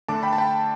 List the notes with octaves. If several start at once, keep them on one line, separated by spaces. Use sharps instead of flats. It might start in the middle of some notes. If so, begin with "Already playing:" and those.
D3 A3 D4 A5 D6
G5 B5
A5
G5 B5